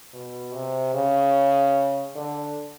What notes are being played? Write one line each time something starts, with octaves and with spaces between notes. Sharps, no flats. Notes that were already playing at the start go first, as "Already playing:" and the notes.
B2
C3
C#3
D3